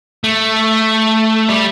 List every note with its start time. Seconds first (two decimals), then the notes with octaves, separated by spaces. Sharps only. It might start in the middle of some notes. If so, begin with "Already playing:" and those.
0.24 A3
1.49 G3